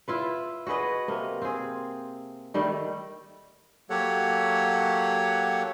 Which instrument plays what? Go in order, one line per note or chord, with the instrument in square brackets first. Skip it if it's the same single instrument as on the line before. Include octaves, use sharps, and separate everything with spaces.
[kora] E4 F4 B4
F#4 G#4 B4 D#5
C3 A#3
C4 G#4
D#3 G3 A3
[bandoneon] F#3 A#3 G4 A4 C#5 F#5